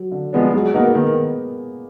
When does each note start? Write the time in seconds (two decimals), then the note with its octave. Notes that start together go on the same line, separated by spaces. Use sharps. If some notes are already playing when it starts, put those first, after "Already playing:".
Already playing: F#3
0.12 D3
0.33 F3 G#3 B3 D4
0.54 F#3 G#3
0.74 A#3 B3 D#4 F#4 A#4
0.95 D#3 B3